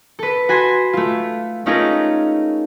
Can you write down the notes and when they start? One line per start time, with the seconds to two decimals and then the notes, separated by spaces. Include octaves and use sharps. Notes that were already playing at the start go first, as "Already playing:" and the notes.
0.19 A4 B4
0.49 F#4 G#5 B5 C6
0.93 A3 F4
1.66 A3 C#4 D#4 F4 G#4 A#4